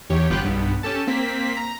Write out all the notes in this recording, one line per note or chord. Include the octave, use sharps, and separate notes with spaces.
E2 G4 C#5
G1 B3 F4 G4 G5 F#6
B1 G2 B3
C#4 G4 A4 A5
A#3 C4 B6
A#5